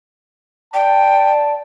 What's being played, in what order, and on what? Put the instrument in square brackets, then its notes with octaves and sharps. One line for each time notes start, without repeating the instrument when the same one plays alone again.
[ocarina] D5 [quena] G5 [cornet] A5